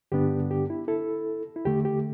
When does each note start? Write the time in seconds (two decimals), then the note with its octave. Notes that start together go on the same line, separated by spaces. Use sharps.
0.12 G2 D3 B3 D4 G4
0.51 G4
0.70 E4
0.88 E4 A4
1.56 E4
1.65 E2 D3 A3 G4
1.85 G4